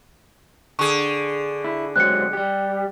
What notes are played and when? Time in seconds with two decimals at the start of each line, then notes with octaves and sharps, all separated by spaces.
0.79 D3 G#4 C#6
1.64 E4
1.96 F#3 G#3 C4 F#6 C#7
2.33 G3 G4